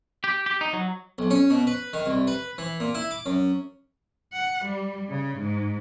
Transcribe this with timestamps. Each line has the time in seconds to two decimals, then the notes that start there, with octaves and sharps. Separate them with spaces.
0.24 G4
0.46 G4
0.61 D#4
0.73 F#3
1.18 B1
1.30 C#4
1.50 B2
1.67 B4
1.93 D#3
2.06 C2
2.27 B4
2.58 E3
2.80 A#2
2.95 E4
3.11 D6
3.26 F#2
4.33 F#5
4.66 G3
5.10 C#3
5.39 G#2